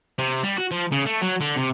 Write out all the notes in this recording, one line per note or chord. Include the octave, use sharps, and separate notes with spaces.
C3
G3
F#4
F3
C#3
A3
F#3
D3
C3